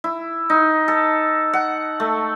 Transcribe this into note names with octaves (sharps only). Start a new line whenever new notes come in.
E4
D#4
A4
F#5
A3